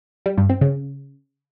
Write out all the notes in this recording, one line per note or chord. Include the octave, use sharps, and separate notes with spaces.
G3
G2
C4
C#3